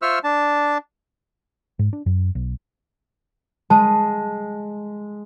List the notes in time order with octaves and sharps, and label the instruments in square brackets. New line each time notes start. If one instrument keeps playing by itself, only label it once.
[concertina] F4 C5 E5 C#6 E6 F6
D4 A5
[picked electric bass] G#2
D4
F#2
B1
[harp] G#3 [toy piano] A5